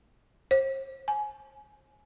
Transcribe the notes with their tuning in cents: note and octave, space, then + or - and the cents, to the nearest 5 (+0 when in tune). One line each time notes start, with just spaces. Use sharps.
C5 +40
G#5 +20